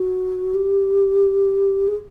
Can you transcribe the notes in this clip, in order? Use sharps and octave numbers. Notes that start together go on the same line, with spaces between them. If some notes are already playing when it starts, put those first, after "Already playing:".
Already playing: F#4
G4
G#4